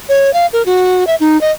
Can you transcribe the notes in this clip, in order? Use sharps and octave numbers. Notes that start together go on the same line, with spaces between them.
C#5
F5
A#4
F#4
E5
D#4
D#5